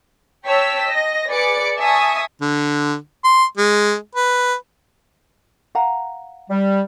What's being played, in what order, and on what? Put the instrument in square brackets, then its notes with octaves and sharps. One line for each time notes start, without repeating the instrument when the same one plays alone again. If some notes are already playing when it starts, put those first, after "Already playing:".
[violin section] C#5 G5 A5 E6 B6
D#5 A#6
G#4 B4 D5 D6 C#7 D7
E5 G#5 A5 C#6 D#6
[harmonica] D3
C6
G#3
B4
[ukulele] F5 F#5 A#5
[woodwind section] G3